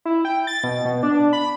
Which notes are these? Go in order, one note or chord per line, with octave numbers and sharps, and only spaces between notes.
E4
G5
A6
B2
B2
D4
B5